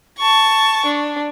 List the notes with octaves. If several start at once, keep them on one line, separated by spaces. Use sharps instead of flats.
A5 C#6
D4